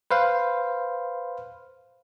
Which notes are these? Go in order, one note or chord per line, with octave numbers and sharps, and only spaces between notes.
B4 C5 F5